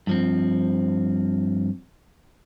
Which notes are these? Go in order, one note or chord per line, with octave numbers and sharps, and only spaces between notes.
G2 F3 C4